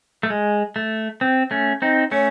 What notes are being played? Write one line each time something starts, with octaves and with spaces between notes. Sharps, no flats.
A3
G#3
A3
C4
A3 C#4
C4 D#4
A3 C#4 C#5